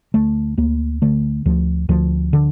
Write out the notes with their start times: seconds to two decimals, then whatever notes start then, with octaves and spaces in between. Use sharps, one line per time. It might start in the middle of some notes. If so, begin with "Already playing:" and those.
0.14 D2 A3
0.57 D2 A#3
1.02 D3 A3
1.46 D2 F3
1.89 D2 F3
2.33 D3